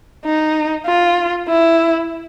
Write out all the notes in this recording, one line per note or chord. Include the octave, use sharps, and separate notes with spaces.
D#4
F4
E4